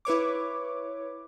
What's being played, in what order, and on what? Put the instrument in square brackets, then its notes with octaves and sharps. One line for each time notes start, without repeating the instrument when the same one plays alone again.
[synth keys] E4 B4 C#5 D6